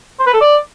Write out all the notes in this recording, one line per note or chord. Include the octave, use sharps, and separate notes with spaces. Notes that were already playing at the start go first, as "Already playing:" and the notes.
C5
B4
A4
D5